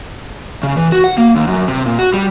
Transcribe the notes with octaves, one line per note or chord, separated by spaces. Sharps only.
C#3
E3
F#4
F#5
A#3
D#2
F#2
C3
A#2
F#4
G3